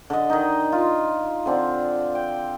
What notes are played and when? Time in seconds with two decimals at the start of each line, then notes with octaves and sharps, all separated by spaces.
0.10 D3 D#5
0.30 D#3 D#4
0.72 F4
1.46 D3 C4 D4
2.15 G5